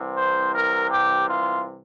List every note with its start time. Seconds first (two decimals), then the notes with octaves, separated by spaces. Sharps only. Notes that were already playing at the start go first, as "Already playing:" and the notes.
Already playing: C2 C3 E3
0.16 C5
0.54 A#4
0.91 G4
1.29 F4